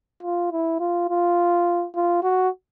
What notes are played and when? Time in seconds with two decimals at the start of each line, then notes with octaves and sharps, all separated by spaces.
0.23 F4
0.52 E4
0.80 F4
1.09 F4
1.96 F4
2.23 F#4